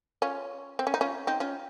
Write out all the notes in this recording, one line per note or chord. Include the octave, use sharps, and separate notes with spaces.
C#4 F4
C4
C#4
D#4
C#4 F4
C4 D#4
C#4 F4